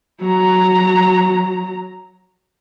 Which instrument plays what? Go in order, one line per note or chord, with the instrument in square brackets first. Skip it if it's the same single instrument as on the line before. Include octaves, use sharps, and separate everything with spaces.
[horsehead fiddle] F#3 A#5